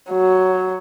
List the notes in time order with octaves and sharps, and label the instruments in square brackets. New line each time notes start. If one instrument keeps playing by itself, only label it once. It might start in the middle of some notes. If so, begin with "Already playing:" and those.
[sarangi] F#3